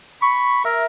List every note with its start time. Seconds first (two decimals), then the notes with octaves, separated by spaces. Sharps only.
0.22 B5 C#6
0.65 A#4 E5